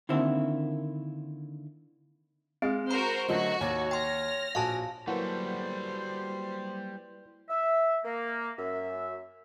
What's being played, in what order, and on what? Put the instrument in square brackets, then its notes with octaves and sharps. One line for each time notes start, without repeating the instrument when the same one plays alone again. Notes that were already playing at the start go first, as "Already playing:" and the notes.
[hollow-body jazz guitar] D3 D#3 A#3 C4 E4 F#4
[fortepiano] G#3 F5 [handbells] C4
[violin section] F#4 A#4 C5 [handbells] B5
[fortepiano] D3 F#3 A3 [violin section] F#4 [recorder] D#5
[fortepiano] D#2 [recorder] C#5
[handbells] G5 C6 [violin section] F6 A#6
[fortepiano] A#1 F#4 G#5 [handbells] F5 A5
[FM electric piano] F#3 A#3 F#4 [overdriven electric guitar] G3 A4 [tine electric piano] E4 B4 [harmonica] C5
[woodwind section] E5
A#3
F#2 E5